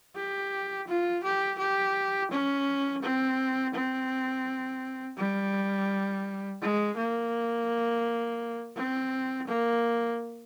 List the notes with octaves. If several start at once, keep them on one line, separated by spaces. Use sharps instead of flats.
G4
F4
G4
G4
C#4
C4
C4
G3
G#3
A#3
C4
A#3